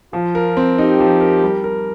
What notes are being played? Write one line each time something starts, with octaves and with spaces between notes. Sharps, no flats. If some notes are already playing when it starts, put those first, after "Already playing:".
F3 F4
A#4
C4
D#4 G4
F3
A#4
G3
A#4